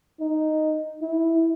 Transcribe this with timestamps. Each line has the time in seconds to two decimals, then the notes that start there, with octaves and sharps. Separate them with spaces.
0.20 D#4
1.02 E4